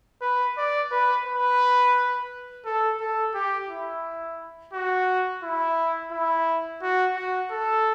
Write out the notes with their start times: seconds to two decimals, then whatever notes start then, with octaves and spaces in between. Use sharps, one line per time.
0.22 B4
0.58 D5
0.91 B4
1.26 B4
2.66 A4
3.00 A4
3.35 G4
3.70 E4
4.74 F#4
5.43 E4
6.12 E4
6.82 F#4
7.17 F#4
7.51 A4